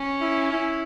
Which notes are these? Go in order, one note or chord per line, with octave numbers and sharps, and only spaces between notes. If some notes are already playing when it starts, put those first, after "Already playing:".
Already playing: C#4
E4
E4